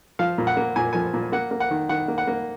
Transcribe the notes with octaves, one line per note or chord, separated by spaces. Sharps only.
F3 F5
A#2
F#5
A#3
A#2 G#5
F3 G#5
A#2
A#3 F#5
A#3
F#5
D#3
D#3 F#5
A#3
F#5
A#3